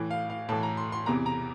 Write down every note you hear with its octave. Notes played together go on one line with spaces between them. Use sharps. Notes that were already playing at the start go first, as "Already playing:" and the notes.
Already playing: A2 E3
F5
F5
A2 E3 A5
A#5
C6
C6
E2 C3 E3 A#5
A#5